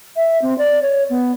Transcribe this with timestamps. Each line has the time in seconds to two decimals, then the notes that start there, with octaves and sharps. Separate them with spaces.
0.16 E5
0.42 C4
0.58 D5
0.83 C#5
1.10 B3